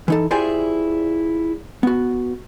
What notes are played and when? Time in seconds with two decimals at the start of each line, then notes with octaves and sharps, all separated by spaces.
0.08 E3 D#4 A4
0.31 E4 F4 G4 G#4 C5 D5
1.83 B3 F#4